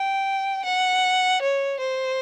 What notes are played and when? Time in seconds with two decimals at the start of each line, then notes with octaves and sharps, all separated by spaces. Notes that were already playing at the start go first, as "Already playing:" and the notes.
Already playing: G5
0.65 F#5
1.41 C#5
1.79 C5